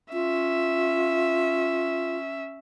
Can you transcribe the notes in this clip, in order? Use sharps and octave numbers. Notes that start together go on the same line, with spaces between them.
C#4 F4 E5